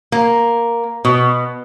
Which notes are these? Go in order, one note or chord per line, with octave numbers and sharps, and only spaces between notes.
A#3
B2